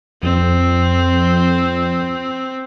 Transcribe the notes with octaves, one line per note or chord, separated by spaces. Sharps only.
F2 C4